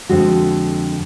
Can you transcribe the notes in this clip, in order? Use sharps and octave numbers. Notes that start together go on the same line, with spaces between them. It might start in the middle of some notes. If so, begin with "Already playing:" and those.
F2 D3 G#3 F#4